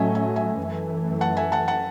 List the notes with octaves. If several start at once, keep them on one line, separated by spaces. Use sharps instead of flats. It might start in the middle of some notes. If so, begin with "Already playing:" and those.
Already playing: A2 F#3 A3 C#4 D#5 E5 G#5
E5 G#5
E5 G#5
F#2 E3 A3
F#5 A5
E5 G#5
F#5 A5
F#5 A5